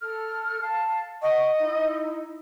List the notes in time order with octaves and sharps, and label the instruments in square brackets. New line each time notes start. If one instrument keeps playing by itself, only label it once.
[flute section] A4 F6
F5 A5
[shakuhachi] D#5 [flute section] F#5 C#6
[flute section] D#4 E4